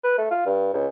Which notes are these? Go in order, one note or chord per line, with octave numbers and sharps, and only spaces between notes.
B4
A3
F4
G2
C#2